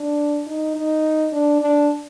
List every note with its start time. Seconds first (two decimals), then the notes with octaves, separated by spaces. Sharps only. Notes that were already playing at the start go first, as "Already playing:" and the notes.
Already playing: D4
0.46 D#4
0.75 D#4
1.32 D4
1.61 D4